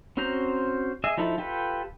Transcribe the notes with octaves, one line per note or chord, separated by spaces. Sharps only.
C4 C#4 F#4 C5 A#5
G#4 D#5 E5
F3 D#4 E4 A4
F4 G4 A4 B4